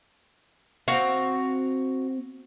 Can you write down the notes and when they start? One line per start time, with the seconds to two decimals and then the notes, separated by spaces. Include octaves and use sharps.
0.88 C4 F#4 F5